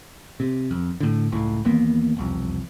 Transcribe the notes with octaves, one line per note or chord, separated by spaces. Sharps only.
C3
F2
A2 D3
F#1 C#2 A2
D#2 E3 A#3 B3
E1 C2 F2